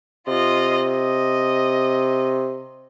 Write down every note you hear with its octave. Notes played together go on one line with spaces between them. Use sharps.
C3 F4 D#5
D#5